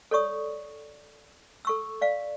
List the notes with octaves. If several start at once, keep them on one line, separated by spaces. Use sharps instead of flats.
A4 C#5 D5 C#6 D#6
A4 C#6 E6
D5 F5